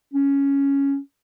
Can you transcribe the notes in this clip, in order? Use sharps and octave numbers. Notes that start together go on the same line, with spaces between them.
C#4